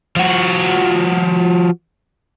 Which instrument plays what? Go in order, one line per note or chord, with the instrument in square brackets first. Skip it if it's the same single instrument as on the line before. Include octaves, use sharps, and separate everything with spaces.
[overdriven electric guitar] F3 F#4